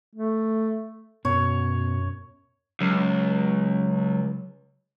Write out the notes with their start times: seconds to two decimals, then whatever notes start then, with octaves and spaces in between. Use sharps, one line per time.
0.16 A3
1.25 F#2 B2 C#5
2.81 C#2 F#3